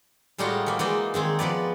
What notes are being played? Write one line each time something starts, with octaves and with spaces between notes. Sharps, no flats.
A2 G3 G#3 D#4 F4 F#4
E3 A#3
E3 G#3 A#3 D#4 D5
D#3 G#3 C4 G#4
F3 B3 B4 D5